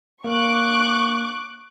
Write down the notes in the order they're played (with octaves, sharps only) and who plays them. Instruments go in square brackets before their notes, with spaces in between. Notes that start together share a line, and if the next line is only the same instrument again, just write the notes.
[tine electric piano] A#3 [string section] C#6 D6 F#6